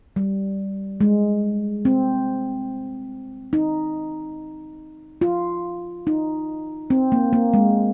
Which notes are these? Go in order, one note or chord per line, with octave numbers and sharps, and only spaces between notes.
G3
G#3
C4
D#4
F4
D#4
C4
A#3
A#3
G#3